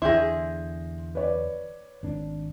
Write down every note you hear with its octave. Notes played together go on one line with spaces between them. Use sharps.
E2 D3 E4 G#4 C6 G6 A#6
B4 C#5 D5
G#1 D4